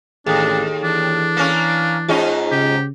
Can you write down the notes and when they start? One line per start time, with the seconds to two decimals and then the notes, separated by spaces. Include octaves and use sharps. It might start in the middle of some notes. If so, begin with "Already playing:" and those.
0.26 A1 D#2 D4 G#4 A4 D#6
0.83 E3 D4
1.37 A#3 C#4
2.08 G#2 C#4 D#4 F4 G#4 D#5
2.51 C#3 G4